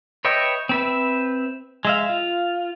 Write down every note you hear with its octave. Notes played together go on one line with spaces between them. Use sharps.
B4 C#5 D#5 E5 G5
C4 B4 E5
G#3 E5 F5
F4